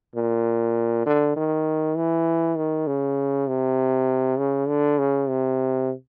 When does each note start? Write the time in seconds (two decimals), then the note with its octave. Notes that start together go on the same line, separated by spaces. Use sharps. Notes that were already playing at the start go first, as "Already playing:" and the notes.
0.15 A#2
1.06 D3
1.36 D#3
1.96 E3
2.57 D#3
2.87 C#3
3.48 C3
4.38 C#3
4.68 D3
4.98 C#3
5.29 C3